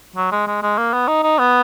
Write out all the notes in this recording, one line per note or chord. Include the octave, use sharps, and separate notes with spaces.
F#3
G#3
G#3
G#3
A#3
B3
D#4
D#4
B3